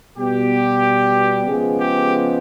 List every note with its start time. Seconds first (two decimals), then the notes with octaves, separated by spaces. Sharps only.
0.17 B2 G3 B3 G4
1.46 C#3 F3 G#3 B3 G#4
1.79 G4